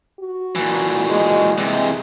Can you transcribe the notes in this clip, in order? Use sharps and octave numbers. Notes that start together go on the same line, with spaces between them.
F#4
A#2 E3
G#3
C3 E3 G#3